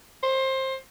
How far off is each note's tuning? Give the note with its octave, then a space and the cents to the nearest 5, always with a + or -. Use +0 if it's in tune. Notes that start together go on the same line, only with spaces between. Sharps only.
C5 +20